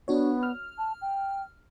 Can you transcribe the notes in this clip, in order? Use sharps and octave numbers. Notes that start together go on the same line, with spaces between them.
B3 D4 F#4 C#5
F6
A5
G5